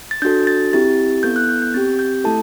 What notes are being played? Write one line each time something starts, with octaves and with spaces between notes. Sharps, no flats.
A6
D4 F#4 A4 G6
A6
C4 E4 G4 A6
B3 E4 A4 G6
F#6
G6
G6
C4 G4 A6
G6
A3 E4 A4 A5